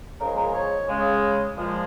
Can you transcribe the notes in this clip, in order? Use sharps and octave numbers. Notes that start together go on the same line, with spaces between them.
C#3 F3 G#3 A#4
A#4
C#5
C#3 G#3
A#2 F3 G#3